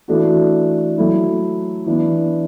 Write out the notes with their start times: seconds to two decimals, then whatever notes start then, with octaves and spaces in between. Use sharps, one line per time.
0.08 E3 A3 D4 F#4
0.98 F#3 A3 E4
1.86 E3 B3 D4